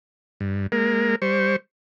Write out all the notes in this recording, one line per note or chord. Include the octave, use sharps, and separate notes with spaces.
G2
G#3 A#3 A#4
G3 C5 C#6